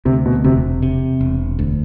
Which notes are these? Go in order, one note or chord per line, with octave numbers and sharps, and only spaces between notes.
D2 C3
B2
E1 C3
C3
E1
D2